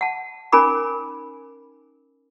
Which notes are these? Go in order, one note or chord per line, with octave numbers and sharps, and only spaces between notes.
F#5 A5
C#4 D#4 A#4 G#5 B5 D6